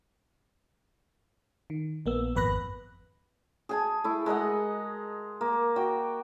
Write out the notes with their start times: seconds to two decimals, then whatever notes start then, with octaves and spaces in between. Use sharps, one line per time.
1.70 D#3
2.06 A#1 A#3 B3 E6
2.35 G#1 F2 B4 B5 F#6 A#6
3.69 G#4 G#5 A5
4.04 A3 E4
4.26 G#3 A#4 D#5 F#5
5.41 A#3
5.76 F#4 G5 D6